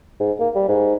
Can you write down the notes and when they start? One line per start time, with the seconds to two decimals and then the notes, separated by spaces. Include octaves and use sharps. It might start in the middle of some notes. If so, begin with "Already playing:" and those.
0.20 G#2
0.39 A#3
0.55 G3
0.68 G#2